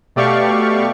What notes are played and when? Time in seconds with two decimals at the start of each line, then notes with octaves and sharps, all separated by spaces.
0.16 B2 A3 G4 D5 F5 C#6